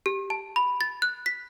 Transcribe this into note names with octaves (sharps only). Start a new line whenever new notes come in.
G4
A5
B5
A6
F#6
B6